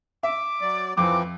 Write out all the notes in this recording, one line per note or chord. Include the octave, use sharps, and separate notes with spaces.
E5 D6
F#3 D5
F2 E3 F3 C4 D6